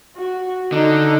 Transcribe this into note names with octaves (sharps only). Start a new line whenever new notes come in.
F#4
D3 D#4